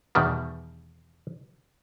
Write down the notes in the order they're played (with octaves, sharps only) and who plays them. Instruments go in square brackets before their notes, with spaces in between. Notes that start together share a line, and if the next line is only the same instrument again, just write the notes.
[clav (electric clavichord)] E2 B2 D#3 G3